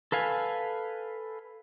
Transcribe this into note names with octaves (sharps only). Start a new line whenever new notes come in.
A4 B4 F5 G#5